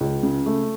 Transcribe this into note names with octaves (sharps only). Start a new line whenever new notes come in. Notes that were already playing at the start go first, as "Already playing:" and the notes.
C#2
C#3
A3